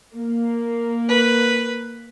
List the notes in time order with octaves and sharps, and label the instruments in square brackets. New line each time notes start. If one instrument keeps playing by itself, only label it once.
[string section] A#3
[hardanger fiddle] B4